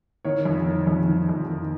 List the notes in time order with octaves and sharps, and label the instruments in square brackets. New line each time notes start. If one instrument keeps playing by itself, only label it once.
[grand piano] D#3 C#5
F2
D#3
F2
D#3
F2
D#3